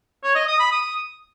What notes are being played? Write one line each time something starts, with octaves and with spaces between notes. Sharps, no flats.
C#5
D#5
D#6
B5
D#6